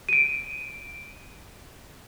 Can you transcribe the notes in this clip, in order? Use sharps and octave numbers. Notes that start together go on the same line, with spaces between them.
D7 D#7